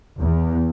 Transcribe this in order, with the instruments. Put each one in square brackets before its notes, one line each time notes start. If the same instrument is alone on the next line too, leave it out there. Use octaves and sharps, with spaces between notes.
[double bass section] E2